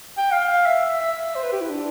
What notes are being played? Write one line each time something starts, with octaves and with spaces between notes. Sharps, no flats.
G5
F5
E5
E5
C5
B4
G4
E4
D4